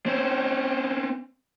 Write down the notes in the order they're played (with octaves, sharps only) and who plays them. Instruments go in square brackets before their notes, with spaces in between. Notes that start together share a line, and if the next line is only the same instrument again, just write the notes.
[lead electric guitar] C4 C#4